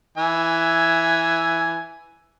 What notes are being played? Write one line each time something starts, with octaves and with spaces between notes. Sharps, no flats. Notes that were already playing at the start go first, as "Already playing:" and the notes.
E3 E5 G#5